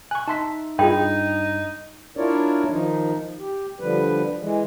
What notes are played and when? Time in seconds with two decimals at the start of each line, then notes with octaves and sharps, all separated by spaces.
0.11 G#5 C#6 F#6
0.28 D#4 E5 A5 C6 B6
0.79 G2 D#4 F4 G#4 G5 B5
2.17 D4 E4 F4 A#4 C#5 D5
2.70 D#3 F3 D#4
3.39 G4
3.80 D3 F3 G3 B4
4.40 E3 G#3